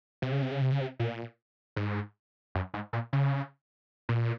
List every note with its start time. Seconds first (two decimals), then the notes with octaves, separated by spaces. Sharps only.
0.22 C3
0.32 C#3
0.42 C3
0.51 C#3
0.61 C3
0.72 C#3
0.81 C3
0.99 A#2
1.76 G#2
2.55 F#2
2.74 G#2
2.93 A#2
3.13 C#3
4.09 A#2